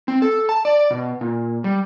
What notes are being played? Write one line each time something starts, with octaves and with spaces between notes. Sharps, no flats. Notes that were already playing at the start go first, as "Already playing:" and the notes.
C4
A4
A5
D5
B2
A#2
G3